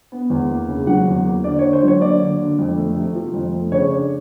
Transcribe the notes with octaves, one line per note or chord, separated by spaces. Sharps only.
B3
E2
A#3
C#3
F#3 F#5
E2
A#3
D3 D5
C#5
D3
C5
F#3 C#5
A#3 D5
D3
D3
F2
A3
C3
F3
F2
A3
C#3 C#5
D4